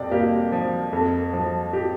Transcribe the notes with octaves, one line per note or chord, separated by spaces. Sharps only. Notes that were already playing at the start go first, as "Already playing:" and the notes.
Already playing: F2 C3 D5 G5
A#3 G4
F3
F2
F3
G4